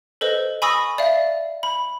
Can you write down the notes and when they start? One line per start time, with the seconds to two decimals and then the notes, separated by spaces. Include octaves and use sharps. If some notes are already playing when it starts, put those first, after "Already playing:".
0.21 A4 B4 C5 D#5
0.62 G#5 B5 C#6 D#6 E6 A#6
0.98 D5 E5 F5
1.63 B5